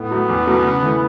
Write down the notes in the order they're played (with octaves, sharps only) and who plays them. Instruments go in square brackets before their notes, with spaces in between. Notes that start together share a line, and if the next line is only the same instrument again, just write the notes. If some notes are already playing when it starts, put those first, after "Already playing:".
Already playing: [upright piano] A2 [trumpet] B3
[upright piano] F#3 A3
E2
B2 F#3 A3
C#3
E3 A3